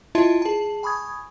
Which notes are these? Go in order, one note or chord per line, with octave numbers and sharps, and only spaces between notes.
E4 F4 D#5 E5 A5 C6
G#4 A5
G#5 B5 C#6 D#6 G#6